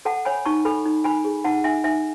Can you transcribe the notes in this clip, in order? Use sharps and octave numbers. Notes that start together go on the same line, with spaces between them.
A4 F#5 A5
C#5 G#5 B5
D#4 A5 C#6
A4 G#5 B5
D#4
D#4 G#5 B5
G#4
D#4 F#5 A5
D#4 E5 G#5
D#4 E5 G#5